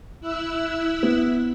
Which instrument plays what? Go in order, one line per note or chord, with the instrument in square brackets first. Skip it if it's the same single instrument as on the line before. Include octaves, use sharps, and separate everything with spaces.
[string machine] E4 E6 F#6
[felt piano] B3